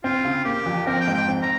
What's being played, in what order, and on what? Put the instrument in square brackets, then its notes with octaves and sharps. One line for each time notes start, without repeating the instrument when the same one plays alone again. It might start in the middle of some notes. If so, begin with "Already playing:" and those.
[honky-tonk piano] C4 [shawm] F4
[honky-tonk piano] C#3
[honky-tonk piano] A#3 [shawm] G4
[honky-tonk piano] F2
[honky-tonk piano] C4 [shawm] A#4
[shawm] G5
[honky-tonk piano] G#2
[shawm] G5
[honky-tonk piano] C4
[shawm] A#5